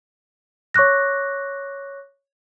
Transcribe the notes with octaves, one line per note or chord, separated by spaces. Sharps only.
C#5 C#6 D6 F#6 A#6